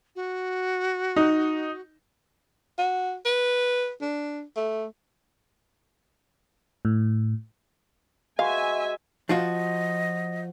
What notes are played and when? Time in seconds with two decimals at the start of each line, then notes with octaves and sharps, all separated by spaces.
0.16 F#4
1.16 D#4
2.78 F#4
3.25 B4
4.01 D4
4.56 A3
6.85 A2
8.39 G#3 F#4 B4 E5 F5 G#5
9.29 F3 F4 F#4 D#5